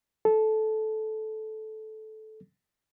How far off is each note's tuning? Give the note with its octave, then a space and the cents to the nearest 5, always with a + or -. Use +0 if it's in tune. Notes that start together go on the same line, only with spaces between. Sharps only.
A4 -15